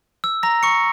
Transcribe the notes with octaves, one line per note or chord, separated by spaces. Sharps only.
E6
A#5 A#6
C#6 C#7